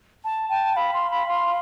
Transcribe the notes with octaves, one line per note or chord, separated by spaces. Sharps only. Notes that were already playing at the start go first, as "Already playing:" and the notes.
A5
G5 A5
F5 B5
C6
B5
C6